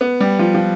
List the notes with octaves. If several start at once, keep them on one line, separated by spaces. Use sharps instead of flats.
B3
G3
F3
F3